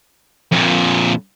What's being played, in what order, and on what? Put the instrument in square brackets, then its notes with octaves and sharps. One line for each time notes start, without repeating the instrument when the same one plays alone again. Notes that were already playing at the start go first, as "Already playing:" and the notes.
[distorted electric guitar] F2 A#2